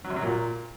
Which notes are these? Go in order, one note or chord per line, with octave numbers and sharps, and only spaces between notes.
F#3
C3
F#3
A#2